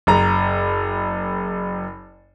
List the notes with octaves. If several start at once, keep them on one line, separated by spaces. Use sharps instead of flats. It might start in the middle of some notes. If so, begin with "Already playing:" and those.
F#1 A#5